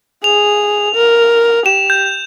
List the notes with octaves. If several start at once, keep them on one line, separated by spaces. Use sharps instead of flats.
G#4 F7
A#4
G4 E7
G6